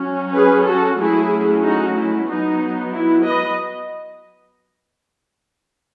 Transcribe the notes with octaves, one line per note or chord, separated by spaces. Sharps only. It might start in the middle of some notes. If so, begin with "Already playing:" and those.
Already playing: F#3 C#4
G#4 B4
F#4 A4
F#3 A3 C#4 E4 G#4
D#4 F#4
E4
F#3 B3 D#4
E4
B4 D#5